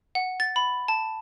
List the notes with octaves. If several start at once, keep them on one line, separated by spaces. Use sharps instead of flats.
F#5
A6
B5
A5